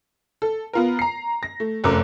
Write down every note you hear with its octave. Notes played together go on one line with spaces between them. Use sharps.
A4
B3 F4 A#4
A#5 C7
A#6
A3
F1 F#2 A3 A#4 D6 F#6